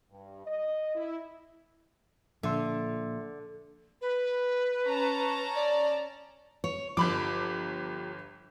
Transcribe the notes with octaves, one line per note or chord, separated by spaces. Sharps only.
G2
D#5
E4
A#2 D3 F3 E5 C6
B4
C#4 A5 A#5
D5
C#5
G1 F3 G4 B5 D6